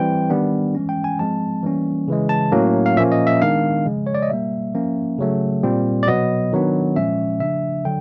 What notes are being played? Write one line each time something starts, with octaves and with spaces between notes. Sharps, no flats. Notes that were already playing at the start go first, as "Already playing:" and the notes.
Already playing: E3 G3 C4 G5
D#3 G3 B3 D4
E3 G#3 C#4
G5
G#5
F3 G#3 C4 A5
E3 G3 A#3 C#4
C#3 E3 G#3
A5
A2 F#3 A#3 C#4
F5
A#2 F3 A#3 C#4 E5
D#5
E5
D#3 G#3 B3 D4 F5
C#3 F3 G#3
C#5
D5
D#5
B2 G3 A#3 E5
F3 A#3 C#4
C#3 F#3 A3
A#2 G3 C4
D5
B2 F#3 B3 D#5
D#3 F#3 B3 D4
A#2 F3 G#3 C#4 E5
C#3 F3 A3 D4 E5
D3 F#3 G5